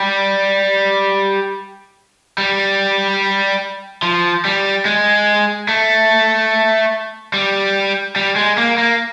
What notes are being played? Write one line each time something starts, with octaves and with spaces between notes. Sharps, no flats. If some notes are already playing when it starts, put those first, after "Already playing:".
Already playing: G3
G3
F3
G3
G#3
A3
G3
G3
G#3
A#3
A#3